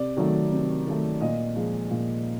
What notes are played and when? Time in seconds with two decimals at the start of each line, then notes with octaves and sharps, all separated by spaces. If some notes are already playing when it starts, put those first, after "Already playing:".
Already playing: C3 D5
0.17 D#3 F#3 A3
0.51 C3
0.86 D#3 F#3 A3
1.21 A#2 D#5
1.56 F3 G#3
1.91 A#2